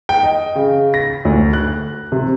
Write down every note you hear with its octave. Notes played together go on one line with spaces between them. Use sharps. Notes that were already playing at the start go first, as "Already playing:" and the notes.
G5
D#5
C#3
A#6
D2
F#6
C3